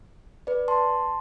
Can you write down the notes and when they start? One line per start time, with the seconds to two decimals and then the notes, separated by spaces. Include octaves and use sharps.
0.47 B4 D5
0.68 A5 C6